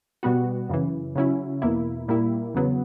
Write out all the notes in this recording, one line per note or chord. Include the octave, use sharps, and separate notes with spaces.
B2 G3 B3 F#4
F#2 C#3 E3
C#3 F#3 C#4 E4
E2 B2 A#3 E4
A#2 G3 A#3 E4
E2 C#3 F#3 B3